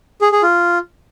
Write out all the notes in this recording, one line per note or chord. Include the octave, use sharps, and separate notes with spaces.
G#4
G#4
F4